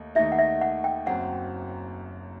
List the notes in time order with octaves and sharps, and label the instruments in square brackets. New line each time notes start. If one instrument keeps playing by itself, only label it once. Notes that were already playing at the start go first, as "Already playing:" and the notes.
Already playing: [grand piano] D#2 D#3 A3 D#4
[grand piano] D#2 D#3 A3 D#4 [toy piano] E5
[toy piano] F#5
E5
F#5
G5
[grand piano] F#1 F#2 F#3 C4 [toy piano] F#5